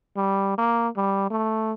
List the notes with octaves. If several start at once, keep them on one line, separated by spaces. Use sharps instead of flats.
G3
A#3
G3
A3